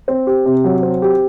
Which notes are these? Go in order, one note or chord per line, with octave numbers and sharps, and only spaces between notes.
C4
G4
C3
F#3
C4
G4